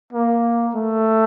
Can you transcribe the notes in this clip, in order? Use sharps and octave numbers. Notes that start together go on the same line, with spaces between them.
A#3
A3